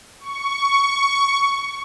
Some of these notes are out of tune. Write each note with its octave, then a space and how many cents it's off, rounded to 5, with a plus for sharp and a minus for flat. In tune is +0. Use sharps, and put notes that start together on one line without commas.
C#6 +10